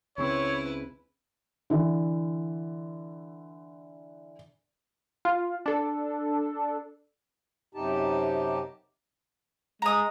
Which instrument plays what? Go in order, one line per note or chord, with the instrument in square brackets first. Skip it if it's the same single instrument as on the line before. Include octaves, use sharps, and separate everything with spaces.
[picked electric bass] C#2 C#3 C4 [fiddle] E4 B4 [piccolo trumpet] C#5
[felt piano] D3 E3
[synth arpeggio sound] F4
D4 A4
[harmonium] F#2 C3 D#4 G4 A5
[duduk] G#3 [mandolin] A#5 D#6